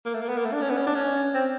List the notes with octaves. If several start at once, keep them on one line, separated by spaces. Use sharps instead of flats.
A#3
A3
A#3
B3
A#3
A3
D4
C#4
B3
C#4
D4
C#4
C4